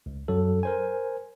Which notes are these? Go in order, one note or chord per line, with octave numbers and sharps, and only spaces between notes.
C#2
F#2 F#3 A4
A#4 C5 G#5